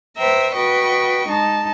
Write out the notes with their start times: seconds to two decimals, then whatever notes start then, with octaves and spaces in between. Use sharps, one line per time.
0.17 B4 C5 E5 G5 A#5
0.55 F#4 B4 D#5 G5 C#6
1.28 G#3 D#4 A5